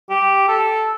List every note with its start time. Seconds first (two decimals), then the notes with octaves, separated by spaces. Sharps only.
0.10 G4
0.48 A4